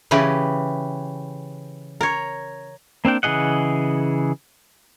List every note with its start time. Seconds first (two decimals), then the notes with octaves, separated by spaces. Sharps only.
0.11 C#3 E3 C#4 G4 B4
2.01 A#4 C#5
3.05 A#3 C4 D4 G5
3.23 C#3 E3 G#4 D#5 F#5